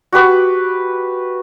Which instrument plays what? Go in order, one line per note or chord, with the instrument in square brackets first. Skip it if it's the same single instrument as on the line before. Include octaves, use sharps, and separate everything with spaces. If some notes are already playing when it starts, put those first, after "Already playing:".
[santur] F#4 G4 B4 D6